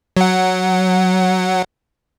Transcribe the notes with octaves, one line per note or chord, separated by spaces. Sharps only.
F#3 F#5